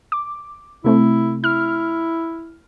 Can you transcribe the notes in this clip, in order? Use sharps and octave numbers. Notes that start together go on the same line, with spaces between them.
D6
C3 A3 C4 E4
E4 F6